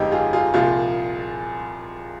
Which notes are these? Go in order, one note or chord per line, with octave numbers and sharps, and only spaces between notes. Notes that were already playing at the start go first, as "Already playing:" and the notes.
Already playing: G1 F2 G#3 D#4 G4
F4 G#4
F4 G#4
C2 A#2 F3 F4 G#4